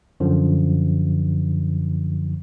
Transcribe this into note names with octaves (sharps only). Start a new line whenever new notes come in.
F#2 D3 F3